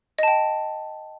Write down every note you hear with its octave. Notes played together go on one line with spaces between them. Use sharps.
D#5 G5 A5